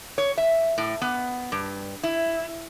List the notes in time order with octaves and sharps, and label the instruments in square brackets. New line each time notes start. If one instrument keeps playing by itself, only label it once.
[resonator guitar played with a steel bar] C#5
E5
A2
B3
G2
E4